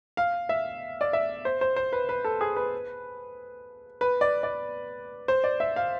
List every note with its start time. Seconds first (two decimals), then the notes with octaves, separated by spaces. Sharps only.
0.17 F5
0.49 E5
1.01 D5
1.13 E5
1.45 C5
1.61 C5
1.76 C5
1.93 B4
2.09 B4
2.24 A4
2.41 G#4
2.56 B4
4.01 B4
4.21 D5
4.43 D5
5.28 C5
5.44 D5
5.60 E5
5.76 F5